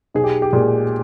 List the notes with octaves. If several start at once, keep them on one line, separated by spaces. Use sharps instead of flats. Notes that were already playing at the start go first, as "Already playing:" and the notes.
B1 G#4
G4
G4
A#2 G#3 G#4